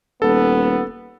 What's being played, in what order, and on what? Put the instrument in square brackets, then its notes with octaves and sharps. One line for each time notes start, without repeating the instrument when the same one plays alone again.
[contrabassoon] D#1 [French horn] B3 [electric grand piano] A4